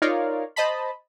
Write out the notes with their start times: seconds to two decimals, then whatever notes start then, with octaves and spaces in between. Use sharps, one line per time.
0.02 D#4 F4 A#4 C#5 D5 F5
0.56 C5 D#5 A5 B5